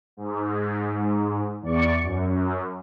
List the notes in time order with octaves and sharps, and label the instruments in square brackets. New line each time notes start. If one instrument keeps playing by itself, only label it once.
[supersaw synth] G#2
E2 D5 C#6
F#2